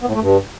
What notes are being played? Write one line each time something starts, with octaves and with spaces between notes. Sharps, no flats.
B3
A2
A3
G2